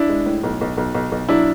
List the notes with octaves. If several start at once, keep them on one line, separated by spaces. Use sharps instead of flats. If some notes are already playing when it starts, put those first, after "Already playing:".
Already playing: D4 E4
G#3
A2
B1
B1
B1
B1
B1
F#3 D4 E4